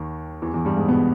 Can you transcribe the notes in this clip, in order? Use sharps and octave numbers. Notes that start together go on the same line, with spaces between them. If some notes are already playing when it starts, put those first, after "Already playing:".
Already playing: D#2 D#3
E2 E3
E2 E3
G2 G3
G#2 G#3
B2 B3